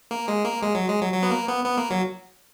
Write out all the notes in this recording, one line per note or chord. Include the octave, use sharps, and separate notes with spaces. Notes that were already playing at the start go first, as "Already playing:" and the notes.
A#3
G#3
A#3
G#3
F#3
G#3
F#3
F#3
B3
A#3
B3
B3
A#3
F#3